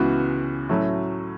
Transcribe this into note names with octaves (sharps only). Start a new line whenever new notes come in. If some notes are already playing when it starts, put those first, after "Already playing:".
Already playing: C#2 C#3 E3 B3 F#4
A2 F#3 A3 C#4 F#4